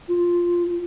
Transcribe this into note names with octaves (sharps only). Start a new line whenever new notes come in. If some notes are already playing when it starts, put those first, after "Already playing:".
F4